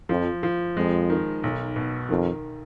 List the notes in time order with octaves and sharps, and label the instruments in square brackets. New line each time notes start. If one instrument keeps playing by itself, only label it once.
[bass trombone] F2 [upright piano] F3
[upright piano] F3
[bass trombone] F2 [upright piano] G#3
[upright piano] D#3
B1
B2
[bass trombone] F2 [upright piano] D#3